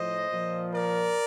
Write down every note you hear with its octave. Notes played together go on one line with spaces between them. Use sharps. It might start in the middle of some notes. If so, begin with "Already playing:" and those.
Already playing: A2 F3 C5 D#5
A#2 F3
A#4 D5